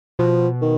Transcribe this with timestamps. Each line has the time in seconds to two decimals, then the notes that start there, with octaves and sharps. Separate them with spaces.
0.19 B2 F3
0.62 D#3